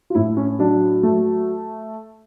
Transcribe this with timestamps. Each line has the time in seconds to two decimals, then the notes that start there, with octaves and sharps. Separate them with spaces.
0.10 F4
0.15 A2 E4
0.37 C#4
0.59 F#3 D4
1.03 A3